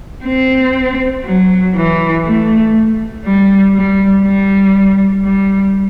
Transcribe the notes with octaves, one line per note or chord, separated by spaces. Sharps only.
C4
F#3
E3
A3
G3
G3
G3
G3